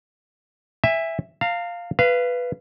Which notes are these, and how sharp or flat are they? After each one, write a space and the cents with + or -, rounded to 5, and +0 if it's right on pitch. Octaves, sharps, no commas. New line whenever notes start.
E5 +0 G#5 -35
F5 +0 A#5 -45
B4 +0 F5 -25